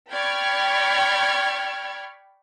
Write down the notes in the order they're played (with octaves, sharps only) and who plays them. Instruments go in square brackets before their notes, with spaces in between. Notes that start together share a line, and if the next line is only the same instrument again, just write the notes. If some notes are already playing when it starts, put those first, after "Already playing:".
[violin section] D5 G5 B5 C#6 F6 G#6